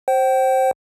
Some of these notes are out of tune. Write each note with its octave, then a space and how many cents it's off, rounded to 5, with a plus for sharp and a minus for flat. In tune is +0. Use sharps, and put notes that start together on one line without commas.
C5 +15 G5 -35